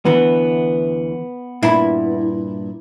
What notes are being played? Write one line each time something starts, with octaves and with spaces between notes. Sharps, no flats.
D2 E3 B3
G2 A#2 E4 B5